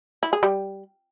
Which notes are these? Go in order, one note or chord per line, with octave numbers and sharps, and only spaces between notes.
E4
G#4
G3